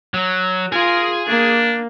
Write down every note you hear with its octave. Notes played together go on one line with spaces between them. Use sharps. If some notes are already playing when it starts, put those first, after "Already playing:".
F#3
F4 G#4 A#4 G#5
A#3 D4